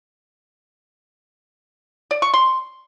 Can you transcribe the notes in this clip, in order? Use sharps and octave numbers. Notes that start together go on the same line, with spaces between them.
D5
C#6
C6